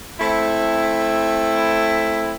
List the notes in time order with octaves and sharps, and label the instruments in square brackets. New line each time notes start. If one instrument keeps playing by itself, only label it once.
[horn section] A3 C4 E4